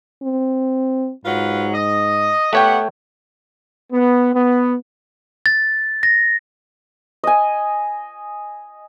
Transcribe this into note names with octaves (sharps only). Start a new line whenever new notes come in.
C4
G#2 F#3 F4 B4
D#5
A3 B3 G4 C#5 F#5 G5
B3
B3
A6
A#6
D#5 G#5